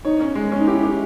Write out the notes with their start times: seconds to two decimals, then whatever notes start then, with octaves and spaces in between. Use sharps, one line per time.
0.05 D#4 C#5
0.21 C#4
0.35 G#3
0.52 C#4
0.59 D#4
0.67 E4 G4
0.83 G4